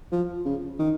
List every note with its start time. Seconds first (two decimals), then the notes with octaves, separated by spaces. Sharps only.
0.12 F3
0.45 C#3
0.79 D#3